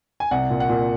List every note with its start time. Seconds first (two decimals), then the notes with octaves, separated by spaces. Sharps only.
0.20 G#5
0.31 C2 F#5
0.50 A#2
0.60 F#5
0.69 A#2